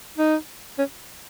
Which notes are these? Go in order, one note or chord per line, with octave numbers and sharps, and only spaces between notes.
D#4
C#4